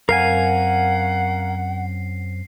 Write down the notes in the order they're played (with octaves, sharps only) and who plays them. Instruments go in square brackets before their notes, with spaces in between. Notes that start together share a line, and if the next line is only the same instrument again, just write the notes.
[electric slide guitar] F#2 C4 [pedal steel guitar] A#4 F5 G#5 [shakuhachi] F#5 [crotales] C7